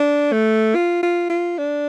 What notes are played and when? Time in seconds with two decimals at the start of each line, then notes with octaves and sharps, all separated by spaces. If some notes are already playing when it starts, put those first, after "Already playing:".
Already playing: D4
0.32 A3
0.75 F4
1.03 F4
1.30 F4
1.58 D4